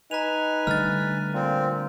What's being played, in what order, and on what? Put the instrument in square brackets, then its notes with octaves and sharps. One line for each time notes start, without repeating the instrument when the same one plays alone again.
[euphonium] D#4 [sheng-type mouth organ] B4 G#5 [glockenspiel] A#5 F7
[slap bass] D3 G3 A3 [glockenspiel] F6 A6
[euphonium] A#2 [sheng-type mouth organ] C4